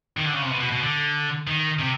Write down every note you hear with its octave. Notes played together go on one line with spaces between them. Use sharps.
D#3
D3
C#3
C3
B2
B2
B2
D3
D#3
C3